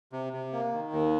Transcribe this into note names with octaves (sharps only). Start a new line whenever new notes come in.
C3
C3
A#3
D#3
D#2